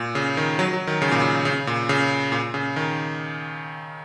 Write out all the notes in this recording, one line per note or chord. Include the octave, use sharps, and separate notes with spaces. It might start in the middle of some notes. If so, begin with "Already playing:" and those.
Already playing: A#2
C#3
D#3
F#3
F#3
D#3
C#3
A#2
C#3
C#3
A#2
C#3
A#2
C#3
D#3